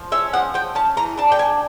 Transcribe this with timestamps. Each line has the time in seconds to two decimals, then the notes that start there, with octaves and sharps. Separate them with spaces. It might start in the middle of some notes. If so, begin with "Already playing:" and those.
Already playing: F3
0.12 C#4 E5
0.33 F3 F#5
0.54 F3 G5
0.75 C#4 A5
0.97 E3 A#5
1.17 D4 A5
1.32 G5
1.39 D4 G#5